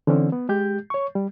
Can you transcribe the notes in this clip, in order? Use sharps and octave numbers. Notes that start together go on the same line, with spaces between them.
D3 E3 C4 C#4
B3
G#3 G4 G6
C#5 C#6
G3